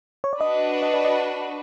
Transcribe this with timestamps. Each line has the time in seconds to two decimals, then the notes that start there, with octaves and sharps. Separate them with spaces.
0.24 C#5
0.33 D5
0.40 D4 F#4 B4 D#5
0.83 D#5
0.94 D5
1.04 D#5